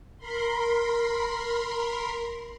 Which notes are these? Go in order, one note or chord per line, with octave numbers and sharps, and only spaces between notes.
A#4 B5 C6